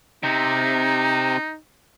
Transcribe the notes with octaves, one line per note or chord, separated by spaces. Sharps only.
C3 D#4